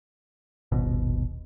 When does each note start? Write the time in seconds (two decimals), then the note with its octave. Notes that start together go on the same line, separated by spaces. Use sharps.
0.72 D#1 G#1 B2